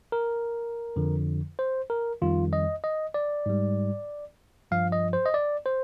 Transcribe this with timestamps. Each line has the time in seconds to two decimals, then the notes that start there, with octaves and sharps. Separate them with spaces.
0.12 A#4
0.96 F2 D3 F3
1.59 C5
1.90 A#4
2.22 F2 D#3 G3 F4
2.53 D#5
2.84 D#5
3.14 D5
3.46 G#2 G3
4.71 G2 F3 F5
4.92 D#5
5.13 C5
5.26 D#5
5.34 D5
5.66 C5